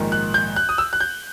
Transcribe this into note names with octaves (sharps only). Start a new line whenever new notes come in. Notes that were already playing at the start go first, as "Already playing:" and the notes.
Already playing: A#1 G#2 D#3
F#6
G6
F#6
D#6
E6
F#6
G6